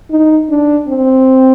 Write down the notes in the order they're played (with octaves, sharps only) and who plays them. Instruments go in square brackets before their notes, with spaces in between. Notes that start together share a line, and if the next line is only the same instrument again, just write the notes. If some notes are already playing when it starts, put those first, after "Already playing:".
[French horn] D#4
D4
C4